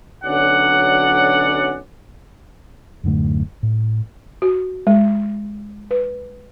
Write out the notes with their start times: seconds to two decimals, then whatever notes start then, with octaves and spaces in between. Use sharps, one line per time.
0.24 B1 D3 F#3 C#4 D5 F#5
3.04 D1 F#2 D3 A3
3.63 A2
4.42 F#4
4.87 G#3
5.91 B4